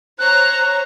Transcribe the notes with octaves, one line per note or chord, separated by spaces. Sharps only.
C5 C#5 A#5 F#6